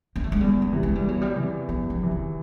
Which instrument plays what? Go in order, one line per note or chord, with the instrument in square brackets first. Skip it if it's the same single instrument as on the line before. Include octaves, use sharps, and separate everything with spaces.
[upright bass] A#3
A3
G#3
[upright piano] E2 [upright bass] G3
[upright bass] G#3
[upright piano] C3 E3
[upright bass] G#3
G3
[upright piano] E2 [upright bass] F#3
[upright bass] G3
[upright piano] C3 E3
[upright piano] E2 [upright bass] F#3
[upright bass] F3
[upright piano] C3 E3
[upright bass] D#3